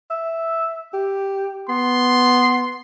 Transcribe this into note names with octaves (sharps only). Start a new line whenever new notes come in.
E5
G4
B3 C6